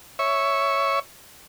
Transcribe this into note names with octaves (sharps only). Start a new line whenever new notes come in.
C#5 E5 C#6